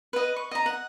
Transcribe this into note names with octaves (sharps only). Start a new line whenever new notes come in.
B4 D#5
C#6
D#5 A#5
F#5